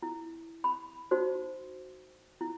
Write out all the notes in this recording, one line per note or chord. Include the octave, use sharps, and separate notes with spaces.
E4
B5
D#4 F#4 C5
E4